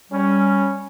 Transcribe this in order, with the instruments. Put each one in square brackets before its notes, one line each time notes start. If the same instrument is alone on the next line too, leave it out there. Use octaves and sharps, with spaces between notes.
[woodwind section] G3 [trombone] C#4